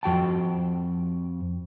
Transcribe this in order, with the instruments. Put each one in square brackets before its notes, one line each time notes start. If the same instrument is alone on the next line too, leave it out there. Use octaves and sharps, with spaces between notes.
[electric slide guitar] F2 F#4 G5 A5